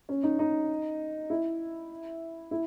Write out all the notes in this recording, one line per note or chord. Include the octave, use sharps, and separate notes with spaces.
C#4
D#4
D#4
E4
E4